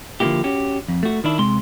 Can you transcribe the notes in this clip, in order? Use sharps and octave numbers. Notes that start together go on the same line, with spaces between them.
D3 F3 F#3 A#3 E4 G4
C#4 F#4 G4
F2
A3 F#4
D#3 D4 E4
C3 G#3 C6